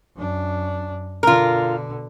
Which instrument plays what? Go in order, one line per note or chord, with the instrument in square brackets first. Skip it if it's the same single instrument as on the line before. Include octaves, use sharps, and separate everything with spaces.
[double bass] F#2 D4
[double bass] B2 D3 [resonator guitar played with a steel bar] F4 A#4